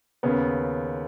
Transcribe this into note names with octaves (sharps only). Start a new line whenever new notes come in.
D#2 C#3 B3